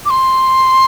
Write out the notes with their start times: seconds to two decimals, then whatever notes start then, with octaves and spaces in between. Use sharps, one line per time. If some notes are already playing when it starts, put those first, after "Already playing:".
0.06 D6
0.10 C6